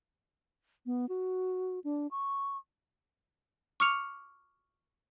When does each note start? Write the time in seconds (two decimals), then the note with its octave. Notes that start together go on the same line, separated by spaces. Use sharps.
0.86 B3
1.09 F#4
1.84 D4
2.11 C#6
3.80 C#6 D6 F6 C#7 F7